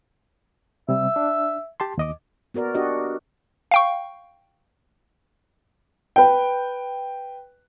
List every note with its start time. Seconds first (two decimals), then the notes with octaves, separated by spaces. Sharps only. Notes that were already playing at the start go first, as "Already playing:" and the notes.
0.89 C3 G3 E5
1.16 D4
1.80 G4 A5 C6
1.98 D#2 D#5 D6
2.54 B3 F#4 A#4 D5
2.75 D4 F#4 G4 D5 D#5
3.71 F5 G5 C#6
6.16 B4 G5